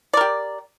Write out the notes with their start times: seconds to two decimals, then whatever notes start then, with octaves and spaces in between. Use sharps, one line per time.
0.13 D5
0.17 A#4
0.21 G4